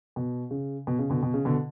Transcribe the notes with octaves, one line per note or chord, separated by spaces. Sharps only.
B2
C#3
B2
C#3
B2 D3
B2
C#3
B2 D3